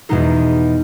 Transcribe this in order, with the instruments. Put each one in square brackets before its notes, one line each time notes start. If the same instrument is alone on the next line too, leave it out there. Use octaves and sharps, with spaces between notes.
[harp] E2 B2 G#3 D#4 G#4